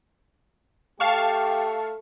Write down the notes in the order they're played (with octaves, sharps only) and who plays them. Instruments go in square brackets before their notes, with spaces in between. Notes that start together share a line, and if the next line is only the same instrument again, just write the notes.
[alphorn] A3 [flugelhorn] G4 [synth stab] F5 A5 C#6